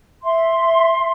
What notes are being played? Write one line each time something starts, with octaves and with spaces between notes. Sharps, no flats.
E5 C6